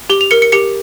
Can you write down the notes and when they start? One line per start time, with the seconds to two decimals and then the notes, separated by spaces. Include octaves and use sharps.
0.10 G4 G7
0.21 F7
0.31 A#4 C#7
0.42 C#7
0.52 G4 C#7